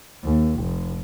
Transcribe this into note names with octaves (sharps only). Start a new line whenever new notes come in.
D#2
F1